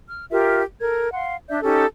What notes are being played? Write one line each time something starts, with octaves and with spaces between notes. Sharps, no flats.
F6
F4 G4 A#4 E5
A4 A#4 G#6
F5 F#5 C6
D4 D5 E5 G6
C#4 D#4 G4 A4